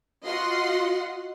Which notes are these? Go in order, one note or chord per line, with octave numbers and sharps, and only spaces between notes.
F4 F#4 D#5 F#5 C6